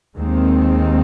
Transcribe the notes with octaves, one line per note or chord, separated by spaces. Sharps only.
D#2 D#3 G#3 C4